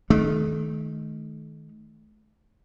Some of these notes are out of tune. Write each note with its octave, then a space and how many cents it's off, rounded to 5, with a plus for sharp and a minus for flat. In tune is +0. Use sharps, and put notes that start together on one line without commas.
D#3 +0 A3 -40